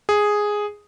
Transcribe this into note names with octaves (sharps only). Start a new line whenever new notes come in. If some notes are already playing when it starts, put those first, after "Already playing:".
G#4